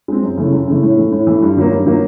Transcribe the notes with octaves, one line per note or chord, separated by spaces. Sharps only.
G#3 C4
F#2
C#3 E3 A3
F#2
C#3 E3 A3
A2
E3 A3
A2
E3 A3
G2
D#3 F#3 A#3
G2
D#3 F#3 A#3